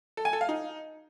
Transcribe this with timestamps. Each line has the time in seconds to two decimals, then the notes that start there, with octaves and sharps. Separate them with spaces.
0.17 A4
0.25 G#5
0.33 A4
0.41 F5
0.49 D#4